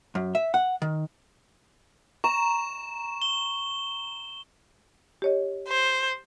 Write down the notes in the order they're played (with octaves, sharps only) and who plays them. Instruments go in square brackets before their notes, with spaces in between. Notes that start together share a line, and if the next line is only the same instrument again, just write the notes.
[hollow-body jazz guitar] F#2
E5
F#5
D#3
[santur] A#5 [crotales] C#6 E7
[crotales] G7
[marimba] G4 C#5 D#5
[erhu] C5